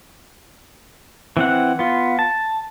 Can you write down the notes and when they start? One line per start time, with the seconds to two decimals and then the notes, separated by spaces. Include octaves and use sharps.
1.37 E3 C4 F#5
1.79 B3 F4
2.19 A5